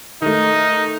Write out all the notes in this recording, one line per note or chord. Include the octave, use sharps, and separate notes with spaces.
D#3 A3 D#4